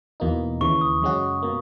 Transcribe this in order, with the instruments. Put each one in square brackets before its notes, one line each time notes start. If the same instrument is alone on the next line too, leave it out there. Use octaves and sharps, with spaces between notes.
[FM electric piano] E2 B2 A#3 D#4
[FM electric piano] D#2 C#3 E3 [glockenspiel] C#6
[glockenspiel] D#6
[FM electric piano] F#2 C#3 G#3 C#4 F#4
B2 A#3